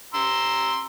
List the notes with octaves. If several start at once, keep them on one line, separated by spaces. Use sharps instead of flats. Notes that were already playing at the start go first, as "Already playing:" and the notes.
A#5 C6 E6